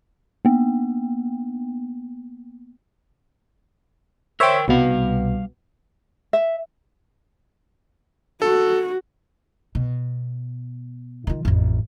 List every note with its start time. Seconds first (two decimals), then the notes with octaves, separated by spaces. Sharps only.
0.45 A#3 B3
4.40 A#4 C5 C#5 E5 G5
4.68 C2 B2 G3 B3 F5
6.33 E5
8.42 F#4 A4
9.75 B2
11.27 D#3 F4
11.45 A1 F2